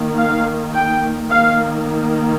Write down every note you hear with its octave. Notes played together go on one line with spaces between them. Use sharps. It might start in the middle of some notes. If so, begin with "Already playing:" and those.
Already playing: D#3 A#3
F5
G5
D#3 A#3 F5